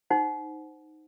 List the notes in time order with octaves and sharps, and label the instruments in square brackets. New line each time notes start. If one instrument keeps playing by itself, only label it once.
[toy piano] D#4 C5 F#5